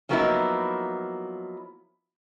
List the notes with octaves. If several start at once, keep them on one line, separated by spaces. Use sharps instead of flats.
F3 F#3 A#3 B3 D#4 E4